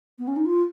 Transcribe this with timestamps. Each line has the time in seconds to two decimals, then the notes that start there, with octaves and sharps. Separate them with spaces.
0.19 B3
0.27 C#4
0.36 D#4
0.45 F4